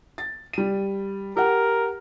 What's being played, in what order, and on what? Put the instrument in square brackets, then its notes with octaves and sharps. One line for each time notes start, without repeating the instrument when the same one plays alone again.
[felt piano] A6
G3 D#7
[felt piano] G4 F#5 [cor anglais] A#4